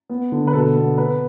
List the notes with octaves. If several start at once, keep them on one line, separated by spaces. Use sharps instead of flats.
B3
D3
B4
B2 A4
B3
B3 B4